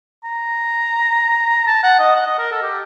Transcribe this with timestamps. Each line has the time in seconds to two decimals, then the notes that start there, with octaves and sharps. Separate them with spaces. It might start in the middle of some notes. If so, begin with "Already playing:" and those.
0.24 A#5
1.67 A5
1.83 F#5
1.99 D#5
2.15 F#5
2.27 D#5
2.39 A#4
2.51 A4
2.62 G4